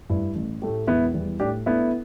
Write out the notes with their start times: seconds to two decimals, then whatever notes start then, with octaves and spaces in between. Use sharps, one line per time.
0.10 G2 G3 E4
0.36 A1
0.62 A2 A3 G4
0.87 E1 B3 E4
1.14 E2 E3 G3 E4
1.40 A2 D4 G4
1.66 A3 B3 D4 E4 A4